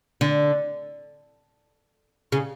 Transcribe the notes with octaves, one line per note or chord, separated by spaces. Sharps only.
D3
C#3